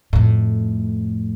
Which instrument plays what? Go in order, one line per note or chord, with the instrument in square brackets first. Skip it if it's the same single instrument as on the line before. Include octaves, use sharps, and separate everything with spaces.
[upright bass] F2 A2